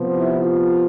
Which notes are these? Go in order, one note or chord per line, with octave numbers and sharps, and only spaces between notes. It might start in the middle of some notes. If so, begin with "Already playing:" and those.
Already playing: C3 F3 B3
E4
F4